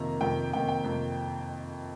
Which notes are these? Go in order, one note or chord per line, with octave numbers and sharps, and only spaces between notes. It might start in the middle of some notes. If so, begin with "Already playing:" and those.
Already playing: F2 C3 D#3 A#3 A#5
F2 C3 D#3 A#3 G5
F2 C3 D#3 A#3 G5
G5
F2 C3 D#3 A#3